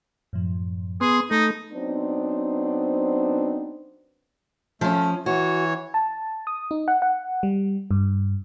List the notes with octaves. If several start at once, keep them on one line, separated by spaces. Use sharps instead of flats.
F#2 A2 F3
B3 G#4 C6 F#6
A3 D#4 A4 B5 A6
F#3 B3 C4 D4 D#4 C5
F3 A3 C#4
E3 F#4 C#5
A5
D#6
D#4
F#5
F#5
G3
G2